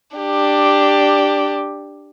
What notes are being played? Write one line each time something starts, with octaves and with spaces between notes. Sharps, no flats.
D4 G4